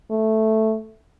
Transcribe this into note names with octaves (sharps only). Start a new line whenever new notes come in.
A3